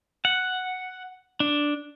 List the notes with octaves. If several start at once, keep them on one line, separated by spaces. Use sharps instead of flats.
F#5
D4